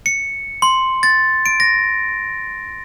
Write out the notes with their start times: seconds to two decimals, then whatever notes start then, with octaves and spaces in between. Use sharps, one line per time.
0.06 C#7
0.62 C6
1.03 A6
1.46 D7
1.60 A#6